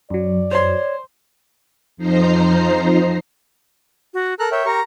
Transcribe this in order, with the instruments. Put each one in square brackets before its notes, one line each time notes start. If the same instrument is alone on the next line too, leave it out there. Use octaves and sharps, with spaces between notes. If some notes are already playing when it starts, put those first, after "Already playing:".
[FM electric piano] F#2 F#3 [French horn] D5
[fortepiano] C5 C6 [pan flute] C#5
[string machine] F2 F3 D#4 C5 A#5 C7
[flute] F#4
[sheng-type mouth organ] A4 A#5 F#6 [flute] A#4
[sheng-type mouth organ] C#5 E5 G5
[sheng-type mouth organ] G4 A#4 C#6 [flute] A#5